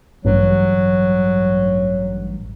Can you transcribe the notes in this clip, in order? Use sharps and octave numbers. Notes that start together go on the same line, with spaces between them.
A1 G2 F#3